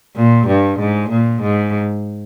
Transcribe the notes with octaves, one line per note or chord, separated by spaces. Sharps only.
A#2
G2
G#2
A#2
G#2